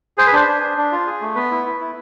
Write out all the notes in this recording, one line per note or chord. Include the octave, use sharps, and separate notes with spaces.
G#4 C5
B4
D4 C5
D4
D4
D4
F4
G#4
A3
B3 B4
E4
E4
E4